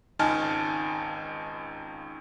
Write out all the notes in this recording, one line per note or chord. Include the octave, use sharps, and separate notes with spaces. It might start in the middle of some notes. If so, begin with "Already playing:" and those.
G#1 C#2 D#4 G#5 A5 F6